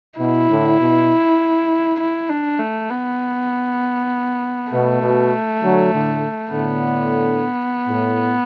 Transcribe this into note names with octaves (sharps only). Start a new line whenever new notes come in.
B2 E4
A2 D3
B2
E4
D4
A3
B3
B2 A3
B2
D3 F#3
A2 D3
A2 D3 B3
A2